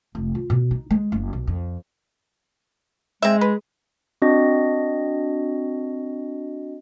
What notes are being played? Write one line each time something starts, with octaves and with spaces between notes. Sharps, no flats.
F1
F4
B2
D#4
G#3
F#1
B1
F2
G#3 C4 E5
B4
C4 D4 F#4 D#5 A#6